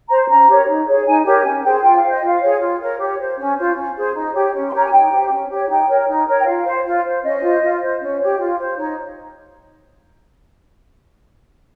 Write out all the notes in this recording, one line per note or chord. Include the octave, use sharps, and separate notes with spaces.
C5 A#5
C#4 A#5
G4 A#4 C#5
D#4
G#4 C#5
D#4 G#5
G4 A#4 C#5
C#4 G#5
G#4 C5 G5
F4 G5
C5 F5
D#5
F4 F5
G#4 C#5
F4
A#4 C#5
G4 C#5
C5
C#4
F4 C5
C#4
G#4 C5
D#4
G4 C#5
C#4
C6
G4 A#4 C#5 A#5
G#5
D#4 G5
G4 C5
C#4
G4 C#5
D#4 G5
A#4 C#5
D#4
A#4 C#5
G5
F4 F5
C5
F4
C5
C#4 D#5
F4 C5
F4
C5
C#4
G4 C#5
F4
C5
D#4 C#5